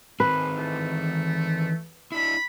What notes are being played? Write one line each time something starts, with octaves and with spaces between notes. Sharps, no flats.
D#3 C4 B4
E3 A3
D4 E4 B5